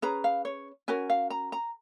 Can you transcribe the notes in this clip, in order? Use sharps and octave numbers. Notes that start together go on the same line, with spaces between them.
C#4 G#4 B4 A#5
F5
C#5
C#4 F#4 A#4 G#5
F5
A#5
A#5